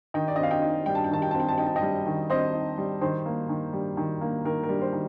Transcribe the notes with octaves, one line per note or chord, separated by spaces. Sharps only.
D#3 D#5 G5
D5
D#5
C4 F5
D#5 G5
D#4
G3 G5
A5
G5
D#3 A5
G5
C4 A5
G5
A5
D#4 G5
A5
D#5 G5
G3
D#3
C4 C5 D#5
D#4
G3
D#3 C5
A#3
D#3
G3
D#3
A#3
D#3 A#4
A#4
G3
C5
D#3